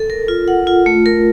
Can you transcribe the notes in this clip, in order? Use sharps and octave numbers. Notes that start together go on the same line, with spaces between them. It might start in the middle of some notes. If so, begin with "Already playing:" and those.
Already playing: A4
A#4
F4
F#5
F4
A3
A#4